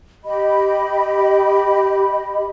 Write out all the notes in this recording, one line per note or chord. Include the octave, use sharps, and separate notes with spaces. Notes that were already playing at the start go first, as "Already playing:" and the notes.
G4 D#5 B5